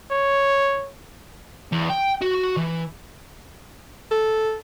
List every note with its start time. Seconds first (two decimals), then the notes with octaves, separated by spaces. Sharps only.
0.11 C#5
1.72 E2
1.89 G5
2.21 F#4
2.57 E3
4.11 A4